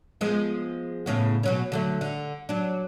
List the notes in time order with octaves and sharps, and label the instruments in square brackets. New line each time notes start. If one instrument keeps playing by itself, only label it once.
[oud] F3 G#3 B3
A2 C#3 B3
B2 F#3 C#4
D3 F#3 A3
D3
F#3 D4